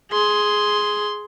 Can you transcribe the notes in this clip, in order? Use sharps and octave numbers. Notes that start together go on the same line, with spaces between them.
G#4 C6